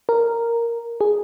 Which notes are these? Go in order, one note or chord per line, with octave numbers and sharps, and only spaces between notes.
A#4
G#4